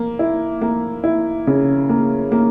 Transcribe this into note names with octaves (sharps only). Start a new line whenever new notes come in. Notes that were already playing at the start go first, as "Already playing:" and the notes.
Already playing: A#3
E4
A#3
E4
C#3
A#3
A#3